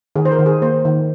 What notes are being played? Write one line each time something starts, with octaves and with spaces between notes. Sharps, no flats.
D#3 G#4
C5
A#4
D#3
G#4
A#3 C5
D#3